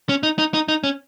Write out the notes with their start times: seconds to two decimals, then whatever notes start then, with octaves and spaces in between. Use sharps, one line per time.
0.09 C#4
0.23 D#4
0.39 D#4
0.54 D#4
0.68 D#4
0.84 C#4